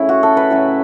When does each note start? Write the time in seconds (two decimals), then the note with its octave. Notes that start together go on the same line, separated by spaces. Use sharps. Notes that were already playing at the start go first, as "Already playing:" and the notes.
Already playing: C#3 A3 C#4 E4
0.09 F#4
0.23 A4
0.37 B4
0.50 A2 F#3 C#4